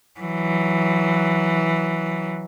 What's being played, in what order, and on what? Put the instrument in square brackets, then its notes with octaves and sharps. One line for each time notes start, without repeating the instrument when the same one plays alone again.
[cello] E3 F#3